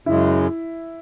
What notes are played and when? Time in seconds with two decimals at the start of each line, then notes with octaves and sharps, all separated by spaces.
0.06 F#2 C#3 G#3 E4